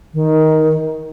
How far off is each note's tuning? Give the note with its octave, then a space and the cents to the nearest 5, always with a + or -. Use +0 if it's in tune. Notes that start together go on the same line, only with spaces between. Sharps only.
D#3 +10